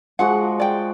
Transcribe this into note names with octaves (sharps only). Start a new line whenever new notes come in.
F3 G#3 F#4 F#5
D5 G5